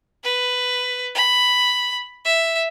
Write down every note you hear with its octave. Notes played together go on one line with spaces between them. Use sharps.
B4
B5
E5